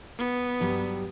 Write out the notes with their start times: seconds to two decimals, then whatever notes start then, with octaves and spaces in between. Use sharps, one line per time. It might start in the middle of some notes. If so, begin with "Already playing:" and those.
0.19 B3
0.60 G2 F#3 G3